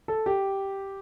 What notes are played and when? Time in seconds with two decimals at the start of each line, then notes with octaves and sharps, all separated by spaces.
0.08 A4
0.26 G4